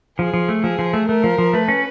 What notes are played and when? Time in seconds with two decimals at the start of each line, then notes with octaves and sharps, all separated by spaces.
0.19 F3 G#4
0.34 F3
0.49 A3
0.63 F3 G#4
0.79 F3
0.93 A3
1.08 A3 A#4
1.24 F3
1.38 F3
1.53 A3 B4
1.68 C#4